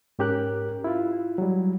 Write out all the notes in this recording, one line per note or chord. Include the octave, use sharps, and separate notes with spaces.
G#2 C#4 G4 A#4 F#6
E4 F4
F#3 G3